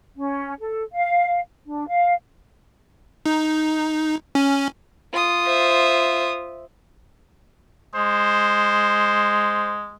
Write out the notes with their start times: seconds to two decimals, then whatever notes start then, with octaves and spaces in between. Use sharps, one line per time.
0.16 C#4
0.60 A4
0.93 F5
1.66 D4
1.88 F5
3.26 D#4
4.35 C#4
5.13 F4 D#6
5.45 C5 E5
7.95 G#3 C5